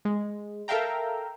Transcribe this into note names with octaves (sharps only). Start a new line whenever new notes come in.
G#3
A4 A#4 E5 F5 G5 A#5